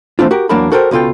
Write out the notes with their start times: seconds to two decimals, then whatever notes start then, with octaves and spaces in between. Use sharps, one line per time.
0.19 E3 A3 C4 D4 F4
0.31 F#4 G4 A#4
0.49 E2 F#3 A#3 D4 A#4 B5
0.72 F#4 A4 A#4 C5 D#5 G5
0.91 C#2 B2 F4 A4 G5